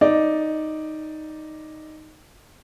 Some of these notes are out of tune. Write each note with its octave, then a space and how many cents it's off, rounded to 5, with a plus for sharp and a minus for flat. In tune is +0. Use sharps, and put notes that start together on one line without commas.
D#4 +0 D5 +0